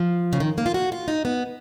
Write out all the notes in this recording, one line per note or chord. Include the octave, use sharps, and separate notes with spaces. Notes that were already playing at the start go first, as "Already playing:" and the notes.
Already playing: F3
C#3
D#3
A#3
F4
F#4
F4
D#4
B3